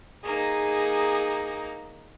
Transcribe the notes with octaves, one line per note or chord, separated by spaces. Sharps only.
A#3 D#4 G#4